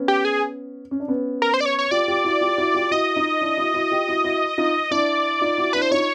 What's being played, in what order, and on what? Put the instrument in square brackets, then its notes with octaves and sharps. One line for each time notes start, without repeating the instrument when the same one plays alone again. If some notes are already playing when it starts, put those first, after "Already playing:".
Already playing: [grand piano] B3 C#4
[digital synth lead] G4
G#4
[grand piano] C#4
D4
B3 C#4
[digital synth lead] A#4
C5
D5
C#5
C#5
[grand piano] F4 G4 [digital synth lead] D5
[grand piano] F4 G4
E4 F#4
F4 G4
E4 F#4
F4 G4
[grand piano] E4 F#4 [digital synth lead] D#5
[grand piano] D#4 F4
D4 E4
E4 F#4
E4 F#4
F4 G4
E4 F#4
E4 F#4
D#4 F4
[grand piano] D4 E4 [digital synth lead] D5
[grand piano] D#4 F4
E4 F#4
[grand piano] D4 E4 [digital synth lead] B4
[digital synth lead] C5
[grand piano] D#4 F4 [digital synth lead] C#5